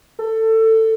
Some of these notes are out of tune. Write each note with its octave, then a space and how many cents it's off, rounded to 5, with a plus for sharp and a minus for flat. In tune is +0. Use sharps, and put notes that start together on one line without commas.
A4 +20